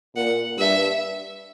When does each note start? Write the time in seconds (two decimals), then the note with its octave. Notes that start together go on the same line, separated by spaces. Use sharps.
0.16 A#2 F#5
0.59 G2 E5